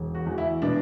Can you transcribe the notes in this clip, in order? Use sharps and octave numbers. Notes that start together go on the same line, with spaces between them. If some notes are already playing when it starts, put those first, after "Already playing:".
Already playing: E1
F#4
E2
E4
B2 D4